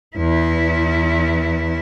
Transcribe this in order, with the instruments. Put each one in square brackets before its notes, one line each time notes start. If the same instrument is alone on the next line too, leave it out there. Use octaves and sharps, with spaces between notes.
[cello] E2 E4